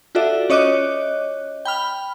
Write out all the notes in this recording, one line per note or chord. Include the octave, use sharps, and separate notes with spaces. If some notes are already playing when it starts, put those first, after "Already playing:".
F4 F#4 A4 D5 E5
C#4 C#5 D#5 D6 F#6
G5 B5 F6